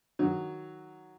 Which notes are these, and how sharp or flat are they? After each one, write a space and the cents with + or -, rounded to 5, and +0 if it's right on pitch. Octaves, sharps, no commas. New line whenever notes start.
D#3 +5 F#3 +0